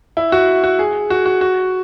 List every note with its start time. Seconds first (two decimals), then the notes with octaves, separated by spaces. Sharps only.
0.17 E4
0.32 F#4
0.64 F#4
0.79 G#4
1.10 F#4
1.26 F#4
1.41 F#4